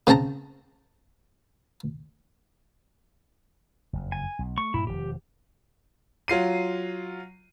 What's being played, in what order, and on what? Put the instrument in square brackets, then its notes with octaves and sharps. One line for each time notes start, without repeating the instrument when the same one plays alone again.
[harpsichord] C#3 C4 G5 A5 A#5
[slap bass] F#1 F2
[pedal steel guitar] G#5
[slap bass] B1
[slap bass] A3 [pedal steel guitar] C#6
[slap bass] G2 A#2 F3 [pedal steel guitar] E4
[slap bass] E1 D#3 F3 [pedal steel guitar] G4
[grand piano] F#3 F4 C7 D#7